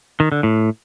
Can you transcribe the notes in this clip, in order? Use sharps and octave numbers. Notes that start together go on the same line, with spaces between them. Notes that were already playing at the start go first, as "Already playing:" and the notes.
D#3
D3
A2